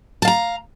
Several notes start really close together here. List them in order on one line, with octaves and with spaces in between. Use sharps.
A5 F5 A#5